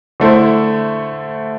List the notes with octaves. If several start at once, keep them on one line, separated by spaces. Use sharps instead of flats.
D3 A3 E4 C5